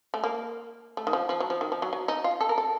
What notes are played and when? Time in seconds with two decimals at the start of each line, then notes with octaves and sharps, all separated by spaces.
0.14 A3
0.24 A#3
0.97 A3
1.07 D#3
1.13 F3
1.29 F3
1.40 F#3
1.50 F3
1.61 D#3
1.72 F3
1.82 F#3
1.93 F#3
2.08 D#4
2.24 F4
2.41 A4
2.49 A#4
2.58 A4